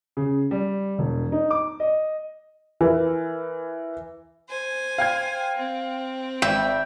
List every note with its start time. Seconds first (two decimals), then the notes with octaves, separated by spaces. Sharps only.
0.17 C#3
0.51 G3
0.99 E1
1.32 D#4
1.51 D6
1.80 D#5
2.81 E3 A#4
4.49 C5 G#5
4.98 F5 G5 G#6
5.56 C4
6.42 G#1 E5 G5